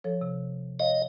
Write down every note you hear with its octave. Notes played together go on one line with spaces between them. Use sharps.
F3 A4 C#5
C3
C#5 D#5 F5